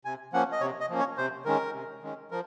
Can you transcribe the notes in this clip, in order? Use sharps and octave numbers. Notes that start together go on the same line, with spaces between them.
C3 G#5
F3 A#3 C#4 F#5
D#5
C3 C#5
D#5
F3 A#3 C#4
C#5
C3 C5
D#3 G#3 C#4 A#4
C3
D#3 G#3 C#4
F3 A#4